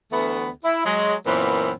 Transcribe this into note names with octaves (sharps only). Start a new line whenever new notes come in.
D2 E3 A3 B3
E4
F#3 G#3
F#2 A#2 E3 B3 C4